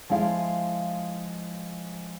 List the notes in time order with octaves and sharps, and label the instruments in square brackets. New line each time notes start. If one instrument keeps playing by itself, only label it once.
[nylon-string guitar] F3 G#3 E4 F5